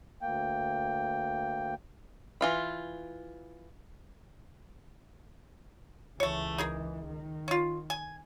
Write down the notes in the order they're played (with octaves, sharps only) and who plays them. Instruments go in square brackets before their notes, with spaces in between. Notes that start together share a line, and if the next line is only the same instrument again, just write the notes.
[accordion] D2 A#3 G5
[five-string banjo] E3 F4 B5
[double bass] C#2 E3 [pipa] A3 C#5
[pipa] D#4 G#4 A#4
[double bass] D#3
[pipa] C#4 F4
G#5